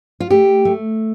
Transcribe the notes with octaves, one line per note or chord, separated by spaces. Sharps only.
F4
A3 G4
A3